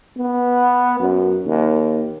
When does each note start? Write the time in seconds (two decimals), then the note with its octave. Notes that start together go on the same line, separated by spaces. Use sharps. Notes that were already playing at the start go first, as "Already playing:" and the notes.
0.17 B3
1.00 F#2
1.45 D#2